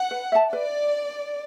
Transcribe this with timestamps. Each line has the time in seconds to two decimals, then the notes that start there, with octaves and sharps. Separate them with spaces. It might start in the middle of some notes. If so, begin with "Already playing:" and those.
Already playing: F#5
0.11 B4
0.32 E5 A5
0.53 B4 D5